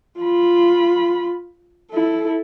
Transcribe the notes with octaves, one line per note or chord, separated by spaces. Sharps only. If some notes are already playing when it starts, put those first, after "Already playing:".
F4 B5
E4 A4